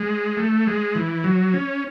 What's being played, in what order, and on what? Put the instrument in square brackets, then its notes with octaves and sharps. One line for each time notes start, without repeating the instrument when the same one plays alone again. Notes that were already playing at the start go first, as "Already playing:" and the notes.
Already playing: [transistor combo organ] G#3
A3
G#3
E3
F#3
C#4